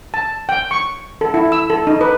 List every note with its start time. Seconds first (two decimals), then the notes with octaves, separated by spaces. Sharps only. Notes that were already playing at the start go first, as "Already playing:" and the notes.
0.14 A5
0.49 G5
0.71 C#6
1.21 A4
1.34 E4
1.52 E6
1.70 A4
1.87 D#4
2.01 B4